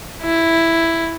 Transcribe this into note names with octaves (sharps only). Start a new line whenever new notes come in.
E4